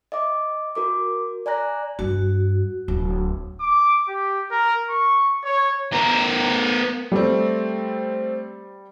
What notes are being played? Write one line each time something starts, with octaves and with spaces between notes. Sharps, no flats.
D#5 E5 D6
F#4 A#4 D6
D5 G#5 A#5 F#6 A#6
G2 F#4
D1
D6
G4
A#4
C#6
C#5
B3 A#4
G3 A3 C4